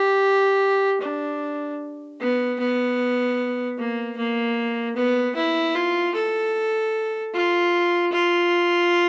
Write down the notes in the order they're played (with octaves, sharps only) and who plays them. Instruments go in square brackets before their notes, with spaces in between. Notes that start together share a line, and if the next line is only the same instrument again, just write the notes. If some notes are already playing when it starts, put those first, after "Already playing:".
Already playing: [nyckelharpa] G4
D4
B3
B3
A#3
A#3
B3
E4
F4
A4
F4
F4